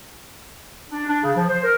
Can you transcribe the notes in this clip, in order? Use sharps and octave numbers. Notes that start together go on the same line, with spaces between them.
D4
D4
C#3
F3
C5
A#4